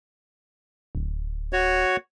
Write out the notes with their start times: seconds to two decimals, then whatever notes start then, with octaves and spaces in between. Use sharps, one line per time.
0.95 D1
1.53 F#4 C#5